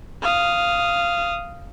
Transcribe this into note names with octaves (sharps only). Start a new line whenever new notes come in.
F5 D#6